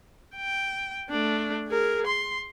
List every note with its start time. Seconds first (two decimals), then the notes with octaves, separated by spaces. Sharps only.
0.36 G5
1.10 A3 D4
1.68 G#4 A#4
2.06 C6